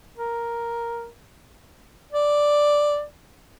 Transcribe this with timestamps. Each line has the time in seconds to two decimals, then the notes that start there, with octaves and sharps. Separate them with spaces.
0.17 A#4
2.12 D5